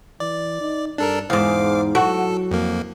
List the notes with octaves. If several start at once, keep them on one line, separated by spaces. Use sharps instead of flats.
E3 D5
D#4
G2 D4 A4 A#4
E2 G#2 C5 F5 D6
F#3 F#4 A4
F2 A#3